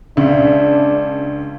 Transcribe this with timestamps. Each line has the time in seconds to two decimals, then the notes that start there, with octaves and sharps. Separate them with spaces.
0.17 C#2 C#3 D4 E5